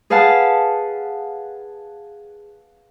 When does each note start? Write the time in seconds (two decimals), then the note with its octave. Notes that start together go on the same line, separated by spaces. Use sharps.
0.10 G#4 B4 F5 F#5 A5